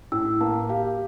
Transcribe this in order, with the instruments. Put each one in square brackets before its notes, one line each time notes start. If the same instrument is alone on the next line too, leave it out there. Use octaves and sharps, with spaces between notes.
[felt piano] A2 [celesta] E6
[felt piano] A#3 [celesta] A5
[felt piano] G4 [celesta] F5